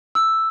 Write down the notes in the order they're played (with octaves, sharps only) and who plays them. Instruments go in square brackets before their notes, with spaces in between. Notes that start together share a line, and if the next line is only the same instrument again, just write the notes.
[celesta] E6